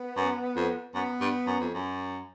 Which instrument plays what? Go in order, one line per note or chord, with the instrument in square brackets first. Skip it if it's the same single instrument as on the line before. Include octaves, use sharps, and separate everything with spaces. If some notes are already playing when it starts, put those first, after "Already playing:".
Already playing: [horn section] B3
[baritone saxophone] F#2
F2
[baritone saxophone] F#2 [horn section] B3
[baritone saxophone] G2
F#2
F2
F#2